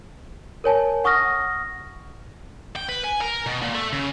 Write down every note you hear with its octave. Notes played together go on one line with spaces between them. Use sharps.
A#4 C#5 G#5 A5
F#5 C#6 D#6 F6 A#6
G5
B4
G#5
A#4
B2
A#2
A3
C#3